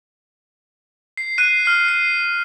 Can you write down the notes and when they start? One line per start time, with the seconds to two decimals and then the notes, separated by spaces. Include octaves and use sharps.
1.17 C7
1.38 F#6 C7 D#7
1.65 F6 C7
1.88 C7